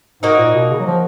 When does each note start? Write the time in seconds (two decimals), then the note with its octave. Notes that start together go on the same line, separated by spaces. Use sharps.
0.22 G#2 A#3 D#4 F#4
0.39 A#2
0.54 B2
0.70 C#3
0.80 F#3
0.86 F3